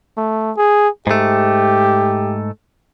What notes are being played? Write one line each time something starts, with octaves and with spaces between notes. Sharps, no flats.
A3
G#4
G#2 A3 G4